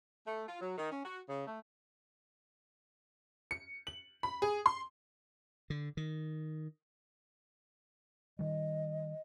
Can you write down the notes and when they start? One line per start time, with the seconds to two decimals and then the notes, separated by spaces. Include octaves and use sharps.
0.27 A3
0.47 F4
0.61 F#3
0.77 D#3
0.91 C#4
1.04 F#4
1.27 C#3
1.46 A3
3.51 C#7
3.87 F#7
4.23 B5
4.42 G#4
4.66 C6
5.70 D3
5.97 D#3
8.39 D#3 G3 D#5